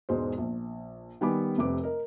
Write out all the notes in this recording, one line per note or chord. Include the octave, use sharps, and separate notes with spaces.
E1 G#2 G#3 C5
A#1
D#3 G3 B3 G#5 B5 D6
F1 C3 B4 D6
A#4 D#5